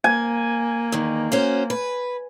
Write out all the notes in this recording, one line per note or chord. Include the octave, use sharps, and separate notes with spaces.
A#3 G#5
E2 D#3
C#4 F#4 C5
B4